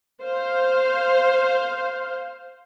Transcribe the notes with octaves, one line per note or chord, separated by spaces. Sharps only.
C5 F5